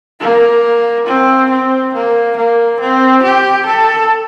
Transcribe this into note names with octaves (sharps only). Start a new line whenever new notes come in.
A#3
C4
C4
A#3
A#3
C4
G4
A4